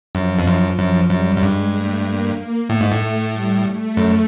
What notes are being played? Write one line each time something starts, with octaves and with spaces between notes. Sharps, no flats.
F#2 F3
F2
F#2
F#2 F3
F#2 G3
F#2
G2 G#3
A3
A#3
A#3
A2 A3
G#2
A2
G3
A3
F#2